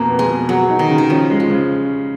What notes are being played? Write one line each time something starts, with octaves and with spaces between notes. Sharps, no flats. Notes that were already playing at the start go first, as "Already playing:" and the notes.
Already playing: F2 B2 A#3
B3
G#3
B2
F#3 G#4
D#4
D#3
C#3
D#3
F3 C#4
G#3
F3
C#3